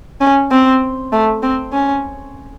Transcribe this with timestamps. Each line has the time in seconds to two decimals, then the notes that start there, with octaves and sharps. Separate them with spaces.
0.21 C#4
0.51 C4
1.12 A3
1.42 C4
1.73 C#4